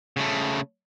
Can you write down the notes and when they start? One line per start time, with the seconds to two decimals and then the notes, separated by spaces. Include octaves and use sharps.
0.17 C#3 A3